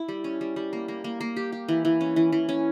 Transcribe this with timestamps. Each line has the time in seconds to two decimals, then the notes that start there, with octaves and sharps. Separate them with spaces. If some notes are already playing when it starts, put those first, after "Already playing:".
Already playing: E4
0.08 G3
0.24 C#4
0.41 G3
0.56 G3
0.73 A#3
0.88 A#3
1.04 A#3
1.21 A#3
1.37 G4
1.52 G4
1.68 E3
1.85 E3
2.01 C#4
2.16 E3
2.32 E3
2.49 C#4